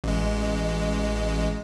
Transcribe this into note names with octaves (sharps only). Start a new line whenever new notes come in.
A1 G#3